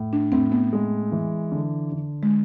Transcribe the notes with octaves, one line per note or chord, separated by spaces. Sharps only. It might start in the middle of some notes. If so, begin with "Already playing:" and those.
Already playing: A2
D4
A2 C4
B3
G#3
E3
D3
D3
G#3